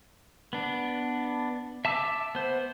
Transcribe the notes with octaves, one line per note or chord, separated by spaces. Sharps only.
B3 D4
E5 A5 D6 E6
B3 C5